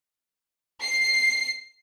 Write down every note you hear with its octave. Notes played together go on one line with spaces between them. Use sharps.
C7